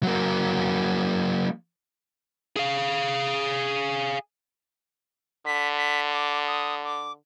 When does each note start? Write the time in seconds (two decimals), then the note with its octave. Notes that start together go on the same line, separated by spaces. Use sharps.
0.03 F#3 A#3
2.56 G#4 F5
5.46 D3 B6
5.77 B6
6.09 D6
6.47 D#6
6.84 D6